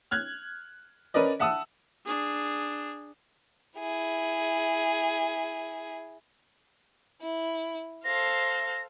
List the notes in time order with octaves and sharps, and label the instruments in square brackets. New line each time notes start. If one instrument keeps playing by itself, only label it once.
[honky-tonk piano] F6 F#6 G#6
C#4 A#4 B4 D5 D#5
E5 F#5 A5 D#6 E6
[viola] D4 G#4
[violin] E4 G#4
[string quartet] E4
[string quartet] A4 C5 F5 [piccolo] A#6